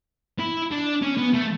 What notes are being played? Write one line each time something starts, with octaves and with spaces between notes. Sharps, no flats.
E4
D4
C#4
B3
A3